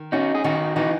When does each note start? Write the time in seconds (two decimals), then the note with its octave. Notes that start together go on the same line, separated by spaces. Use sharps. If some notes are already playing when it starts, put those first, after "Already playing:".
Already playing: D#3
0.12 C#4 D#4 F#4
0.35 G#4
0.44 D#3 D#4 F#4
0.76 E3 D#4 F#4